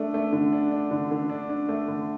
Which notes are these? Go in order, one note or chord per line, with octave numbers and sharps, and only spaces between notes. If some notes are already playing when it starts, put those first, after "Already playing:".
Already playing: A3 D4
A3
D3
D4
D4
D3
D3
D4
D4
A3
D3